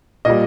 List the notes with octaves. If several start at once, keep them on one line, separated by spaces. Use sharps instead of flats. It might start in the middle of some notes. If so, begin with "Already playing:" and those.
A#2 G3 D#5